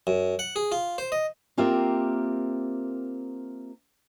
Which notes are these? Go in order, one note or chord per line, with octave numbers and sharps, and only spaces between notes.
F#2
F#5
G#4
F4
C5
D#5
A#3 C4 F4 G4 A#4 E5